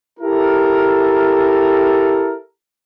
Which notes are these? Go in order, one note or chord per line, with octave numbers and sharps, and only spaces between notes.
E4 G4 A4 A#4